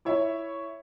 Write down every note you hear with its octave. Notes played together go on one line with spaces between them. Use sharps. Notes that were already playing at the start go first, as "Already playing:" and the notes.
E4 C#5 E5